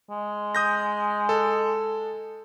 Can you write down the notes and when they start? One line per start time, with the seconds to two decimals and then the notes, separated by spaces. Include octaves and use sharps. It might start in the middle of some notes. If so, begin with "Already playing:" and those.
0.10 G#3
0.55 D#6 G6 A#6
1.29 A4